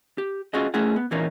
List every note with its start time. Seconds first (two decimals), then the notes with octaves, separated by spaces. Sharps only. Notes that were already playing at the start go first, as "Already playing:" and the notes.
0.18 G4
0.54 C#4 F4 F#4 G#4 D#5
0.74 A3 C#4 E4 G#4 F#5
0.96 B3
1.11 E2 A#2 E3 A#3 C#4 D#4